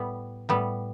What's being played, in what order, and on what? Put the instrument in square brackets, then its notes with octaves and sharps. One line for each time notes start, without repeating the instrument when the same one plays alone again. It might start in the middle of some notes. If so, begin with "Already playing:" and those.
Already playing: [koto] A2 G3 B3
A2 G3 B3